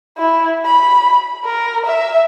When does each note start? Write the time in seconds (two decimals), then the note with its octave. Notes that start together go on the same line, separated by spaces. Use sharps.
0.18 E4
0.65 B5
1.45 A#4
1.86 E5